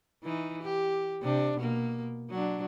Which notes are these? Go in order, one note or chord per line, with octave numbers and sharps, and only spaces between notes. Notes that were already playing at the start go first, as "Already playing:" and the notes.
E3 D#4
G4
C3 D4
B2 A#3
F#3 D4